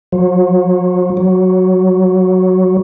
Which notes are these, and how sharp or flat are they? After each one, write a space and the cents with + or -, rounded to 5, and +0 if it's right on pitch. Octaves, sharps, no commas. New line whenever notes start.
F#3 -40
F#3 +0